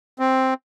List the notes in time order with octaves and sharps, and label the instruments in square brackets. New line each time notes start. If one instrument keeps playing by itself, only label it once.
[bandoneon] C4